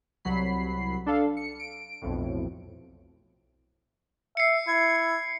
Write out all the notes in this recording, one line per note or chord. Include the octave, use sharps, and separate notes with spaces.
C2 F#3 B5 C7
D4 A4 F5
C#7
D7
B1 F2 A2
E5 C7 C#7
E4 G#6